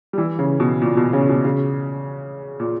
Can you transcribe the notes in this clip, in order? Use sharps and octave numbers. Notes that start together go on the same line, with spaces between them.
G3
E3
C#3
B2
A#2
B2
C#3
B2
C#3
A#2